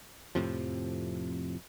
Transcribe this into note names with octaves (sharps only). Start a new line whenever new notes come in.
F2 A2 C3 F3